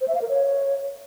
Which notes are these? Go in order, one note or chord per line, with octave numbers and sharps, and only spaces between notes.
C5
E5
F5
A#4
C#5